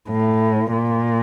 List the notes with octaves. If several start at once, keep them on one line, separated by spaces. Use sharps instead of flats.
A2
A#2